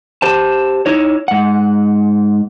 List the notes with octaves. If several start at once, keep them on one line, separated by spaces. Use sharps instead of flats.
G4 C5 A5
D#4 E4 C#5
G#2 F#5